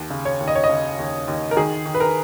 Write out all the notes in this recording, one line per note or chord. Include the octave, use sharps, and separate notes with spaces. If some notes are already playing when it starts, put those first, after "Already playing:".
Already playing: D#2
C#3
C#5
D#2
D#5
C#5
D#5
C#3
D#2
D#2
A#4
D#3 G#4
D#3
B4
A#4